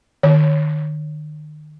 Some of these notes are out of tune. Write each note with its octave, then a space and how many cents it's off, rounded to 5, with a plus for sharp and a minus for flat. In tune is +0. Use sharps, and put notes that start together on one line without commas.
D#3 -40 C#5 +0